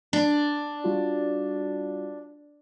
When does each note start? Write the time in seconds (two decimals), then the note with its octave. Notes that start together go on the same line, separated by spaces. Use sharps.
0.13 D4
0.84 G3 F4 F#4